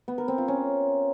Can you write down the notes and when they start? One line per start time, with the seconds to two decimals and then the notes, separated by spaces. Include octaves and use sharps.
0.08 B3
0.18 A#4
0.28 C4
0.38 F4
0.48 C#4